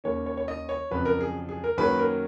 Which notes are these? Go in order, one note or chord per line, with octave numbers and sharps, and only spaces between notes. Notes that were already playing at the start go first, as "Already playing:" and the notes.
D#2 D#3 A#3 C#4 C#5
C#5
C#5
D#5
C#5
F2 C#3 F#3 B4
A#4
G#4
G#4
A#4
F#2 D#3 F#3 A#3 C#4 B4
A#4